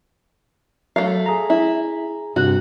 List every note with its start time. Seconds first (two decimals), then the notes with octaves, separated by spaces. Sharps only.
0.96 F#3 A3 F5
1.26 G#4 A#5
1.50 E4
2.36 G2 C3 F#4 F#6